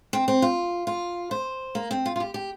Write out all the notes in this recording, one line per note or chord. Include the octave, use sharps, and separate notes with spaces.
C4
C4
F4
F4
C5
A#3
C4
F4
F4
G4
G4